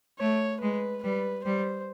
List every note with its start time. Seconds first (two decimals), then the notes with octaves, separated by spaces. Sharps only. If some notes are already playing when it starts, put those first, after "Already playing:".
0.19 A3 C#5
0.61 G#3 B4
1.03 G3 B4
1.45 G3 C5